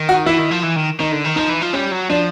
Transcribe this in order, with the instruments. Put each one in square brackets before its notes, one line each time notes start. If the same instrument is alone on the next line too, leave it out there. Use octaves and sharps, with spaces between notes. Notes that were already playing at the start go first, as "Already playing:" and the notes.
Already playing: [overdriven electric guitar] D#3
[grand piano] F#4
[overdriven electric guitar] E3 [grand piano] E4
[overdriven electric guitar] D#3
F3
E3
D#3
[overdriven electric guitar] D#3 [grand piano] D#4
[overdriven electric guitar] D3
D#3
[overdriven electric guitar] F3 [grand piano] D#4
[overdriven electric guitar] E3
F3
[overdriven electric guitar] G3 [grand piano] C#4
[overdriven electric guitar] F#3
[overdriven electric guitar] F3 [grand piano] D4